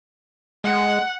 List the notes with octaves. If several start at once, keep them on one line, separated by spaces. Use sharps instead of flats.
G#3 F#5